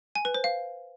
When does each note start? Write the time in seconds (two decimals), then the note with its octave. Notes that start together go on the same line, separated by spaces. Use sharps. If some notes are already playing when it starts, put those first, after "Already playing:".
0.15 G#5
0.25 B4
0.35 C5
0.44 F5